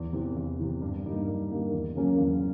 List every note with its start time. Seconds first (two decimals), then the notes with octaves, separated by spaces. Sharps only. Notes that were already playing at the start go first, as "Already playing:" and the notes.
Already playing: E2
0.13 C3 E3
0.36 E2
0.59 C3 E3
0.82 G2
1.04 D3 G3 A#3 D#4
1.27 G2
1.50 D3 G3 A#3 D#4
1.73 E2
1.95 C#3 F#3 A#3 C#4
2.18 E2